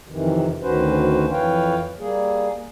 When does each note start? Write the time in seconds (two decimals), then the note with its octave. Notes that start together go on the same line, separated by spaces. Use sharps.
0.09 F2 C3 D#3 E3
0.62 D2 D#3 C#4 F#4 B4 C5
1.31 F2 E3 B4 C#5 F5 G5
1.99 G3 A#3 G#4